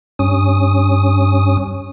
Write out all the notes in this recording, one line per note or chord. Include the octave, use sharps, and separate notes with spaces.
G2 C#4 D#6